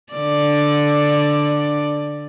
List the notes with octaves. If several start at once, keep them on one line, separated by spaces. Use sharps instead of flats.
D3 D5